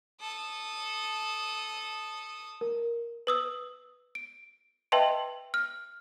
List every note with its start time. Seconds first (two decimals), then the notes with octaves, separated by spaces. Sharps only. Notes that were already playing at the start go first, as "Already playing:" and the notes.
0.21 A4 D#6
2.61 A#4
3.27 B4 D#6 E6
4.15 D7
4.92 B4 D#5 E5 G5 A5 C6
5.54 F6